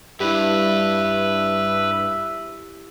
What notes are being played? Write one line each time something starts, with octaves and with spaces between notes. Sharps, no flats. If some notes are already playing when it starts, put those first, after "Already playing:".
G2 E4 G4 B4 E5